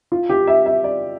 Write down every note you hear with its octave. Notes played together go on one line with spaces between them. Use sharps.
F4
G4
E5
E5
D5